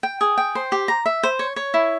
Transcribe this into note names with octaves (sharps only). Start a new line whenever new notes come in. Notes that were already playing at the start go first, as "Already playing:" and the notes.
G5
G#4
G5
C5
G4
A#5
E5
C5
C#5
C#5
E4